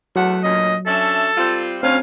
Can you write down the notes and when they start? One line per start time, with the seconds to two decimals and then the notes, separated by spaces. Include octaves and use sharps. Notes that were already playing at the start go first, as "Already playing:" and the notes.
0.16 E2 F#3 A3 F#5
0.43 D2 A#2 C#4 D#5
0.86 C#4 D4 A4 E5
1.37 G3 C4 F4
1.83 D2 C4 C#4 F5